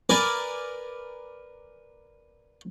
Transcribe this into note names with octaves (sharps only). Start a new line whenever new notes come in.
A#4 B4 D5 G#5 A#5